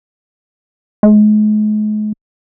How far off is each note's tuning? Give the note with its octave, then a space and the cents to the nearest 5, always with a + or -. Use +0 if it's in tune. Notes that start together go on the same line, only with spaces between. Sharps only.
G#3 +40